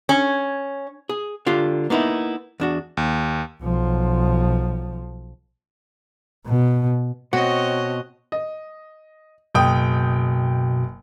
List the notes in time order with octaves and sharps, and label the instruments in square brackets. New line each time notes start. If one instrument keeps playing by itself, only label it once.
[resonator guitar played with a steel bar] C#4
[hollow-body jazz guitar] G#4
D3 F4 G4
A#3 B3 D#4 E4
E2 D4 F#4
[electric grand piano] D#2
[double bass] B1 F3
B2
[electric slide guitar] B2 [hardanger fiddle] C4 D#5 [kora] F#4 [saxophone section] C#5
[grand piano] D#5
[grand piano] F#1 G5 D#6 [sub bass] B2